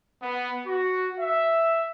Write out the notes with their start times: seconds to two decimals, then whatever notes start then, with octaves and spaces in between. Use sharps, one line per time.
0.23 B3
0.67 F#4
1.19 E5